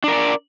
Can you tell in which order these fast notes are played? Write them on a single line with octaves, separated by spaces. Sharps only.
D4 A#4 D5